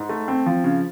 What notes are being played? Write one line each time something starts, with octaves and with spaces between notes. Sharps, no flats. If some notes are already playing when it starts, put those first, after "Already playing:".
Already playing: G#2
A3
C4
F3
C#3